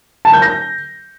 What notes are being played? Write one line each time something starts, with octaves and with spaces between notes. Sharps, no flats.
A5
G6
A#6